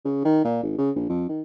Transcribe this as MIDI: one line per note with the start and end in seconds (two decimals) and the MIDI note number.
0.05 0.22 49
0.25 0.41 51
0.45 0.59 46
0.63 0.75 32
0.78 0.91 49
0.96 1.07 34
1.10 1.24 41
1.29 1.42 51